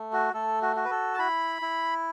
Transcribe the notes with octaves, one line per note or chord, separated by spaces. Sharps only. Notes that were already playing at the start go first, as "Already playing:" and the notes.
Already playing: A3
F#4
A3 A4
F#4
F#4
B4
A4
A5
E4 B5
E4